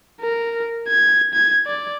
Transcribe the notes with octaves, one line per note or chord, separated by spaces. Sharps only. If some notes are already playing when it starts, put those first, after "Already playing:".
A#4
G#6
G#6
D5